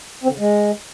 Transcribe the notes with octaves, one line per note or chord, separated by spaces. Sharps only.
C4
D3
C#3
G#3